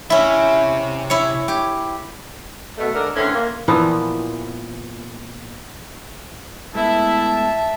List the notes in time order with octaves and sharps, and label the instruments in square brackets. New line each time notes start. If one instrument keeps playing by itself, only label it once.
[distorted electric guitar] C3 E5 [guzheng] C#4 E4
[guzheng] E4 C#5
G4
[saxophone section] B2 A3
G#2 D3 A#4
D3 E3 A3 C4 C#4
A#3
[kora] A#2 E3 F3 B3
[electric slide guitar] G#3 A3 B3 [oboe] E4 [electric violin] E5 A5